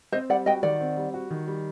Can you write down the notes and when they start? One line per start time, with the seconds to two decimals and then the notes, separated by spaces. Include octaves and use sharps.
0.12 C4 C5 D#5
0.30 G3 D5 F#5
0.46 F#4 D#5 G5
0.63 D#3 D5 F#5
0.80 C4
0.97 G3
1.14 F#4
1.30 D#3
1.47 G3